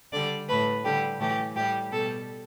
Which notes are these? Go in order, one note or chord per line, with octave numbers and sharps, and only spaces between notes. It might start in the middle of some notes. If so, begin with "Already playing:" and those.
D3 G3 D5
A2 A3 B4
D3 G3 G4
A2 E3 A3 G4
A2 G3 G4
B2 A4
G3